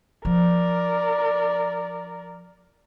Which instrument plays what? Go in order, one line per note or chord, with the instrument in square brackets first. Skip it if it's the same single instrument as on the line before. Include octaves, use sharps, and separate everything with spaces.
[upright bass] F3 [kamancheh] A#4 D5